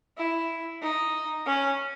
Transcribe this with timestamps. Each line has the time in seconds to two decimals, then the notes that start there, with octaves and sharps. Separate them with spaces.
0.17 E4
0.82 D#4
1.46 C#4